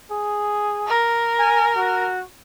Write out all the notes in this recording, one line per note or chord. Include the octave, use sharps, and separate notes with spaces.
G#4
A#4
G#5
F#4